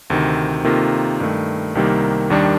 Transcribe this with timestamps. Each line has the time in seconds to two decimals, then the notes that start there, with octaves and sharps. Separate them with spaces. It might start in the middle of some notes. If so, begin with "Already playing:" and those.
0.10 D2 C3 D#3
0.64 C3 D#3 A#3 F4 A4
1.20 G2 D#3 A3
1.75 C2 C3 D#3 G3 A#3
2.30 D#2 D#3 G3 D4